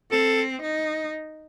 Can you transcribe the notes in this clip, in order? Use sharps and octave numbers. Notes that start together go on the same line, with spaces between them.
C4 A4
D#4